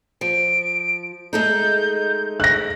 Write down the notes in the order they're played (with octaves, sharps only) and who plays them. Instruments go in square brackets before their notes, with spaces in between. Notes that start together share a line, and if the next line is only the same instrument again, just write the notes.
[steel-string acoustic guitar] F3 [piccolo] D7
[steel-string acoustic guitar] G#3 A3 D#4 [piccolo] G6
[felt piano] F#6 A#6